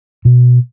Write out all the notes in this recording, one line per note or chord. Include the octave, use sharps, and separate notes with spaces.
B2